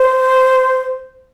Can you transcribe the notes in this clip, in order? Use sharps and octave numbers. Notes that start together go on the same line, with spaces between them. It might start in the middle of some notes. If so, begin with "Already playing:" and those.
Already playing: C5